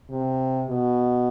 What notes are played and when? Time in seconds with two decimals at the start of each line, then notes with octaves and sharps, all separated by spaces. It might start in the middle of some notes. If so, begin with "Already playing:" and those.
0.10 C3
0.70 B2